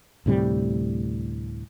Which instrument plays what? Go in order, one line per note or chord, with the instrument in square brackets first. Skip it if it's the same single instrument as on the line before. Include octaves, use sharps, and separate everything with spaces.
[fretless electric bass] D2 A2 C3 G3